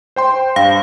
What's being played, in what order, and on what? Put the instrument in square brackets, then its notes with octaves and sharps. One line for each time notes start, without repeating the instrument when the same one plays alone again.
[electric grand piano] C5 G5 C6
[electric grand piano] G2 [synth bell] F5